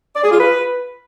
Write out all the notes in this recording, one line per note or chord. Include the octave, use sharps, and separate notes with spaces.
D5
G#4
F4
B4